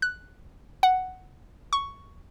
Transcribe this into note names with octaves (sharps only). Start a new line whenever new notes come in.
F#6
F#5
C#6